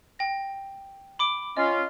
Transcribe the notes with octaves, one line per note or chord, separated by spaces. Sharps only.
G5 A#6
B5 D6 D7
C#4 F4 D#5